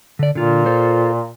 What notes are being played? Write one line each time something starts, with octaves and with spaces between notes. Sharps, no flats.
D3 D5
A#2 D3 F4
F4 A4 C5